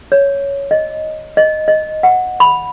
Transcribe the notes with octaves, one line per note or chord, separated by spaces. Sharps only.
C#5
D#5
D#5
D#5
F#5
B5